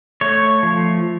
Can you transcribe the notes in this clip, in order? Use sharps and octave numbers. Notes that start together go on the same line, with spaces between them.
A3 C#5
F3